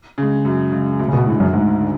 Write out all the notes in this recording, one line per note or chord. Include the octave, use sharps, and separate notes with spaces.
C#3 G#3
F#2
C#3 G#3
D2
C#3
B2
A2 D3 G#3
F#2
D2 G#2
D3